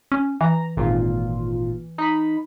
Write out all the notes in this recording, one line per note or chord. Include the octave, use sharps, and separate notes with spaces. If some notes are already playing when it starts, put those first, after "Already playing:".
C#4
E3 A#5
G#1 A#2 F4
D#4 B5